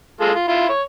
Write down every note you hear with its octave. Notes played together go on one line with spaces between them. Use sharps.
G#3 F4 A4
F4
E4 F4
C#5